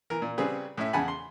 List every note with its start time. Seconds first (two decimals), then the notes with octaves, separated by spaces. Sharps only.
0.10 E3 A#4
0.22 A#2
0.38 C#3 G3 C4 G#4 B4
0.77 A2 C#4 E5
0.93 E2 C#3 F#5 G#5 A5 B5
1.08 C6